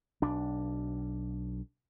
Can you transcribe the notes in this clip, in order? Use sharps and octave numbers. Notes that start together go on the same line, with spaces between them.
B1 D4